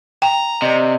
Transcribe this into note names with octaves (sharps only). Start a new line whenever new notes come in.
G5 A#5
C3 D5 D#5